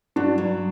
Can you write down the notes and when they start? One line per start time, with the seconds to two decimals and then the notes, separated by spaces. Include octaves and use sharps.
0.16 G2 D4 F#4
0.38 F#3